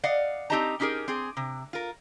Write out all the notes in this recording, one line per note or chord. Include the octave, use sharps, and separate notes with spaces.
D5 D#5 F5 F#5
C4 D#4 G4 D#5 A5 A#5
C#4 D#4 G4 G#4 A#4
C4 G#4
C3
F4 A#4